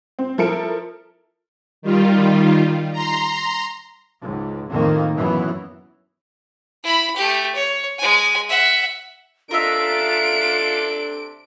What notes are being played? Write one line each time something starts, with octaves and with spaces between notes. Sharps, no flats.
C4
F3 E4 A4 A#4 C#7 D7
D#3 G3 F4
A#5 C6
C#2 G#2
F2 A2 D#3 A#3 C4
F#2 B2 E3 F#3 B3
E4 B5
A3 G4
C#5
G#3 G#5
E5 F#5
C3 D4 F4 A4 A#4 D#5 E5 D7